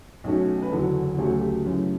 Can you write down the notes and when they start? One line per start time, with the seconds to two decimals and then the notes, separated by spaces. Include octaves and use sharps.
0.24 B1 B2 A3 C#4
0.62 B4
0.71 F#1 E2 D3 F#3 A4
1.18 D2 C#3 F#3 A3 G4
1.29 A4
1.40 G4
1.65 F#2 C#3 E3 A3 C#4